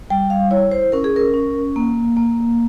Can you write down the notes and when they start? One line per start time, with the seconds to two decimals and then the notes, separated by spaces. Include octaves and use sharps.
0.10 G3 G5
0.30 F5
0.51 E4 C#5
0.71 C5
0.92 C#4 A#4
1.04 G#4
1.16 A#4
1.34 C#4
1.76 A#3
2.17 A#3